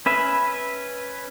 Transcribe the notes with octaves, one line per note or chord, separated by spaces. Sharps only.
C#4 B4 E5